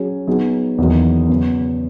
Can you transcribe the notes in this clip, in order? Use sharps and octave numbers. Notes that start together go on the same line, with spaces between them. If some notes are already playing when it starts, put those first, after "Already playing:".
Already playing: F#3 C#4 G#4
F#3 B3 D#4 G#4
E2 D#3 F#3 A#3 D#4
C#3 F#3 B3